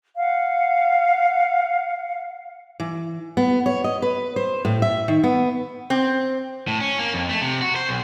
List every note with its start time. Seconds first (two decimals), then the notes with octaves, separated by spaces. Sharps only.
0.16 F5 F#5
2.80 E3
3.37 B3
3.66 C#5
3.84 D#5
4.02 B4
4.36 C5
4.65 A2
4.82 E5
5.08 D#3
5.23 B3
5.90 C4
6.68 A2
6.80 C#4
6.99 A#3
7.14 F2
7.29 A3
7.42 C3
7.62 F#4
7.76 C5
7.89 B1